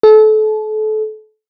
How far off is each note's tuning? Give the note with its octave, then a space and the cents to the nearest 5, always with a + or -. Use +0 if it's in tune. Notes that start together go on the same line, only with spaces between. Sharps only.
A4 -30